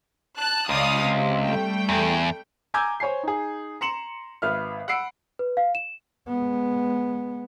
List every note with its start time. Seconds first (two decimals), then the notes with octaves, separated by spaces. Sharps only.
0.38 A5 F#6
0.69 C#2 D5 F5 D#6
1.01 C3
1.43 G3 A3 G5
1.89 E2
2.74 G#5 A#5 D6 E6 G6 G#6
3.00 C5 C#5 G#5 C7
3.23 D#4 G#4
3.81 A#5 C6 C#7 E7 F#7
4.42 G#1 B4 E5 F6
4.88 F#5 B5 E6 C7 D7
5.39 B4
5.57 F5
5.75 E7
6.27 G#3 B3